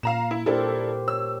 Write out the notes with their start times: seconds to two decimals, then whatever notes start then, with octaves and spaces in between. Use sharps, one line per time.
0.03 A#2 F5 A#5 E7
0.31 E4
0.46 D4 E4 G4 A4 A#4 C5
1.08 C#5 E6